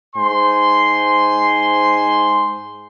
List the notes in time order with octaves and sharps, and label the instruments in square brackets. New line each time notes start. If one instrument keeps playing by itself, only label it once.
[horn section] G#2 C5 G#5 C6